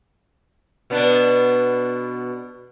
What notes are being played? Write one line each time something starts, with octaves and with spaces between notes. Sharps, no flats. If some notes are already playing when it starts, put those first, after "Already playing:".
B2 B3 D4